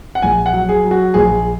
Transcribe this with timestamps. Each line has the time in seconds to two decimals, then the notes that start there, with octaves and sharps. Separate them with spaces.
0.15 F#5
0.22 A#1 G#5
0.46 F#5
0.54 F#3
0.69 G#4
0.84 F#3
0.91 F#4
1.14 A#1 G#4